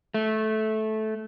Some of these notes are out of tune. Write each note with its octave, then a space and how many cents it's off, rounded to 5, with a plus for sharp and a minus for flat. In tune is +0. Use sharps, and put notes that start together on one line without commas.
A3 -15